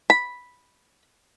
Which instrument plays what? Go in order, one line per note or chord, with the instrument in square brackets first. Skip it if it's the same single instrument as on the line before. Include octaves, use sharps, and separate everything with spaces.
[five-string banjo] B5